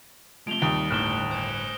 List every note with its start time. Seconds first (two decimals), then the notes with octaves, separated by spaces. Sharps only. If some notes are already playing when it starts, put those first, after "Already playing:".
0.47 C3 F3 G#3 A3 D7 F7 G7
0.62 D#2 G3 D#6 D7
0.90 G1 A2 D#3 A3 F6 F#6 E7 G7
1.31 C5 G#5